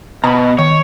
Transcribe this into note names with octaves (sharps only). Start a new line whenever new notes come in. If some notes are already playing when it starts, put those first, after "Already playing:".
B2 A#5 B5
D#3 C#5